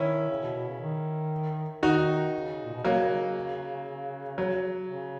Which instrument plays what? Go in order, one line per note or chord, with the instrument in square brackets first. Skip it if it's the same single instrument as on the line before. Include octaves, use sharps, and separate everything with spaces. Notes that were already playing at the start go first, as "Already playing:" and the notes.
Already playing: [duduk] D#3 [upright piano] C#4 E4
[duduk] C#3
B2
B2
C#3
D#3
[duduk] D#3 [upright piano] D#4 F#4
[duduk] C#3
A#2
B2
[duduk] C#3 [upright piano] F#3 A#3
[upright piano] F#3
[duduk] C#3